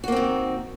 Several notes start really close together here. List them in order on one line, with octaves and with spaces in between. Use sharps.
F#4 A#3 C4 D#3